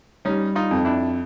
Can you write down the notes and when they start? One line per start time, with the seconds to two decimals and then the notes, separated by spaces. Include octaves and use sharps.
0.25 G3 C#4 D#4
0.55 D#4 F4
0.71 F2
0.85 D4 E4